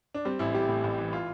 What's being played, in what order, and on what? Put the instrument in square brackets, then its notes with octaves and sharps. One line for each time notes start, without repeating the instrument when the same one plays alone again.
[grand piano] D4
G3 C4
A1 E4
G3 G4
A2
A1
E3
F4